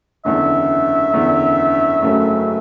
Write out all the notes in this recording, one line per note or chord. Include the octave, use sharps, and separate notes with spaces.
F#1 E2 D3 E5
F#1 E2 D3
F#1 F#2 C#3 F#3 A3